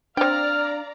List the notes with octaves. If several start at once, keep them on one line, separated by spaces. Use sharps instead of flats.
C4 D4 D5 F5 G5 A#5 F6